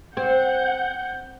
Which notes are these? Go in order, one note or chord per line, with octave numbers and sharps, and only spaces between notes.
C4 F#5 G6